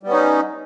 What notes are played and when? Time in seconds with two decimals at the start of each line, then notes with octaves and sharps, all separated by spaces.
0.03 G3
0.07 B3
0.10 C#4
0.13 D#4